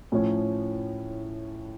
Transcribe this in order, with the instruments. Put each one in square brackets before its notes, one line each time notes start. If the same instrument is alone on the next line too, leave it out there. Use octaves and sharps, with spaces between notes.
[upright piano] A2 F3 A3 C#4